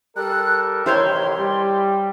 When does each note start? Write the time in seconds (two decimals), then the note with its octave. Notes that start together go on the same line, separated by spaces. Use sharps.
0.16 G3 A4 A#4 F#6
0.86 A1 C3 D#3 E4 C5 C#5 C6
1.38 G3